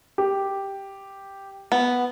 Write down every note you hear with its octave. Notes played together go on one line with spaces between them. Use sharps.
G4
B3